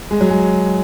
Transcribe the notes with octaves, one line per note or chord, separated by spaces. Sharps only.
G#3
F#3
G#3